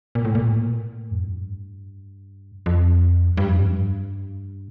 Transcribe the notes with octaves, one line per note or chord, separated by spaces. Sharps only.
A#2
A2
A#2
A2
F2
G2
F2
G2
F2
G2